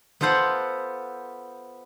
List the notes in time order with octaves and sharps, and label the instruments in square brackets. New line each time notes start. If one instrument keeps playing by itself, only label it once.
[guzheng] B3 F4 A4 C5 F#5